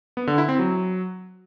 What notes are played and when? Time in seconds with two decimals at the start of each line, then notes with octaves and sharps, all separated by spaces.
0.17 B3
0.27 D3
0.38 E4
0.49 C4
0.59 F#3